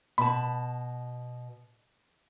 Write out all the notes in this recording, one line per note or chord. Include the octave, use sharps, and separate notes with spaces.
B2 A5 B5